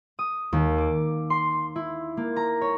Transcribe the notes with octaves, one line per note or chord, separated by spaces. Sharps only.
D#6
D#2
D6
C6
E4
A#3
A#5
C#5